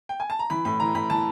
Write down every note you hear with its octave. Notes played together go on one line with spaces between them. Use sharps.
G5
G#5
A5
A#5
E3 B5
A2 B5
E3 A#5
A2 B5
E3 A5